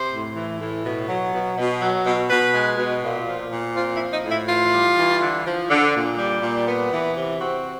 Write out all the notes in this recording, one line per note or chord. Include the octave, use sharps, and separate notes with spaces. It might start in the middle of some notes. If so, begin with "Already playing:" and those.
Already playing: C3 C5
A2
E3
A2
B2
F#3
B2
B2
F#3
B2
B2 B4
G#3
B2
A#2
F3
A#2
C4 F4
E4
F3
D#4
A2
E4
E3 F4
G3
E3
D3
F3
D3
A#2
G3
A#2
B3
E3
C3
C4 F#4